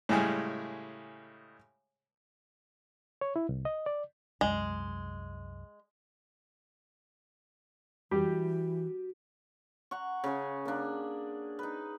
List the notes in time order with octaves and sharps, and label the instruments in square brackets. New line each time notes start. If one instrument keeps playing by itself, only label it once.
[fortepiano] A2 C#3 G3 G#3 G#4
[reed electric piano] C#5
E4
C2
D#5
D5
[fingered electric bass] C2 F#2 [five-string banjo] G#3
[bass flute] E3 [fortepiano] G3 G4 [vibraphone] F#4
[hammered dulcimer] F#5 A#5 C#6
C#3 G#4 C#5 G#5
A#3 D4
D#4 B4